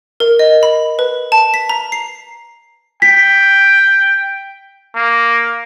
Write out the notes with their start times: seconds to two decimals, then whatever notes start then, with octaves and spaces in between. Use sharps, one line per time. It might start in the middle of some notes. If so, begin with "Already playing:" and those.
0.20 A#4
0.39 D#5
0.63 B5
0.99 B4
1.32 A5
1.54 B6
1.69 A#5
1.92 C7
3.02 G5 B6
4.95 A#3